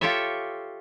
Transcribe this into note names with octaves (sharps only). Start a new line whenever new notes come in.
F4 G4 A4 C#5 E5